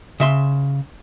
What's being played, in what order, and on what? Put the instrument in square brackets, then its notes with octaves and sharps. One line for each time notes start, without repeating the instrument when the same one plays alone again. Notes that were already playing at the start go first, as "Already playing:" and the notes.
[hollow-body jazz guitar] C#3 E5 C6